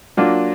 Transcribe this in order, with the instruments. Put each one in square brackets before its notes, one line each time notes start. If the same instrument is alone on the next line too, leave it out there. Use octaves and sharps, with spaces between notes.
[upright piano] F#3 A#3 D4 F4